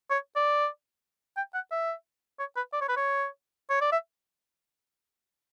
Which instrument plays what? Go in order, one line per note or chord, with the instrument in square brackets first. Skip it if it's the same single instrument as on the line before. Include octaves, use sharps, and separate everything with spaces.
[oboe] C#5
D5
G5
F#5
E5
C#5
B4
D5
C#5
B4
C#5
C#5
D5
E5